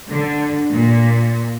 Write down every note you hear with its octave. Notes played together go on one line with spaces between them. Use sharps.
D3
A#2